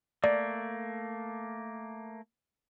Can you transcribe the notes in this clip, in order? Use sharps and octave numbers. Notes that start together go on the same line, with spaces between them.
A3 A#3 D5